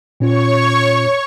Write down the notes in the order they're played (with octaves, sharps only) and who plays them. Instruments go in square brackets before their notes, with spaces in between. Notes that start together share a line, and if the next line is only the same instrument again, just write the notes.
[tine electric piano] A#2 C#4 F4 [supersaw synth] C#5 C#6